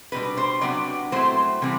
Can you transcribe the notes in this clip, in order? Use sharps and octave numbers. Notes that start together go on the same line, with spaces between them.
B2 G3 D4 B4
C5
C3 F#3 B3 D4 D5
F#3 A3 C4 E4 C5
C3 E3 G3 C4